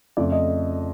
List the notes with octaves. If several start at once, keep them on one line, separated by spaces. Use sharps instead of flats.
F2 C#3 F3 A3 D5
D#5